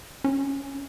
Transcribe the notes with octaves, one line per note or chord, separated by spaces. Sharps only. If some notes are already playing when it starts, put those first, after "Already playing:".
C#4